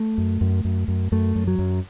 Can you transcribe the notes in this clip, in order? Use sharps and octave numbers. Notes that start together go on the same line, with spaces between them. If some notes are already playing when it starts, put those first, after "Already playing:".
Already playing: A3
F#2
F#2
F#2
F#2
F#2 A3
F#2
F#3
F#2